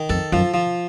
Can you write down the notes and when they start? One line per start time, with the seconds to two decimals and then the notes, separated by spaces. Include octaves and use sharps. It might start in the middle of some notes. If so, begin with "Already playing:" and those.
Already playing: D#3
0.09 F2 A4
0.32 F#2 F3
0.54 F3